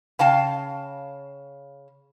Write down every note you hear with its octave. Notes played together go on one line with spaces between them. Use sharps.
C#3 F5 G5 A5